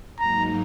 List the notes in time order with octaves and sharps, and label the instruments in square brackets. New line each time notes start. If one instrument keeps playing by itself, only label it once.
[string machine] G#2 F#3 A#3 D#4 [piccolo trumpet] A#5